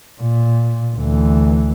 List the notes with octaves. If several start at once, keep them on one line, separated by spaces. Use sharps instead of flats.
A#2
D2 E3